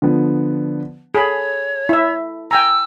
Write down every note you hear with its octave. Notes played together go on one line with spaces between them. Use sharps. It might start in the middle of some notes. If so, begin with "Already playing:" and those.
D3 F3 B3
G#4 A4 C#5 B5
E4 E5
G5 G#5 A#5 E6